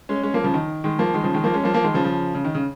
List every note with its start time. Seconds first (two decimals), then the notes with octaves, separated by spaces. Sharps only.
0.09 G#3 C#4
0.23 G#3 C#4
0.34 F3 A#3
0.44 C#3 F3
0.54 D#3
0.84 D#3 G#3
0.99 F3 A#3
1.14 D#3 G#3
1.24 C#3 F3
1.34 D#3 G#3
1.44 F3 A#3
1.54 G#3 C#4
1.64 F3 A#3
1.74 F3 A#3
1.84 D#3 G#3
1.94 C#3 F3
2.04 C#3 F3
2.35 C#3
2.45 D#3
2.55 C#3